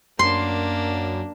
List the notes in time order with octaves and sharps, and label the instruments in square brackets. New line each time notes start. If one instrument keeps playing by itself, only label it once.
[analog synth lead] F#2 [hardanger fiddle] A#3 D4 [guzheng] C6